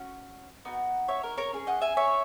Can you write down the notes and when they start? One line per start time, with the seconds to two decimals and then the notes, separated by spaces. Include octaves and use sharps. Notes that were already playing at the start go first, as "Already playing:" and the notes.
Already playing: C#4 F#4
0.65 B3 D#4 F#4
1.08 C#5 E5
1.23 A#4
1.38 A#4 C#5
1.53 C#4 G#4
1.67 D#5 F#5
1.82 E5 G#5
1.97 C#5 E5